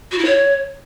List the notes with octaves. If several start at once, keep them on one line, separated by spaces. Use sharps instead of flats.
F#4
E4
C#5